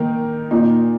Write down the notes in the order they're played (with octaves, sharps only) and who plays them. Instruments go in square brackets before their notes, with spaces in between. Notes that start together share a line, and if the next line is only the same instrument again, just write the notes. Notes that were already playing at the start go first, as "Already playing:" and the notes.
Already playing: [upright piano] D#3 A#3 D#4 A#4
A#2 A#3 D#4